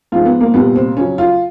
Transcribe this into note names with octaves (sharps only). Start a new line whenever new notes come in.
G#2 F3 G#3 F4
B3
A#3
C2 A#2 G3 B3
C4
F2 C#3 F#3 C#4
F4